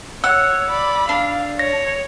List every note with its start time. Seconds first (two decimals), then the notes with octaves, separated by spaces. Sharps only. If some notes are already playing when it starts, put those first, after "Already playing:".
0.24 C#5 F#5 E6
0.70 D5 B5
1.09 D4 F5
1.59 C#5 A#6